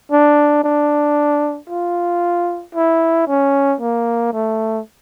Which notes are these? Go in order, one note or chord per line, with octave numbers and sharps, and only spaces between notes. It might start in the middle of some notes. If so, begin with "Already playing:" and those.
D4
D4
F4
E4
C#4
A#3
A3